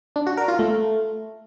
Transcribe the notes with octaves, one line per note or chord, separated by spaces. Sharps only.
D4
F#4
A#4
F4
A3